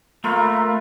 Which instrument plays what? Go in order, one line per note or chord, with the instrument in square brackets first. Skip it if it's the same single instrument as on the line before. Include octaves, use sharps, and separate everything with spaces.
[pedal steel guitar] A3 [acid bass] A#3 [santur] F4 B4 F5 [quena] A#5